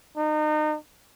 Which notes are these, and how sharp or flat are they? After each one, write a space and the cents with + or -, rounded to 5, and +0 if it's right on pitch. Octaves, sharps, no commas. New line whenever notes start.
D#4 -30